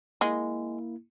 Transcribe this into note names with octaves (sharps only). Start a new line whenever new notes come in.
G#3 A#3 E4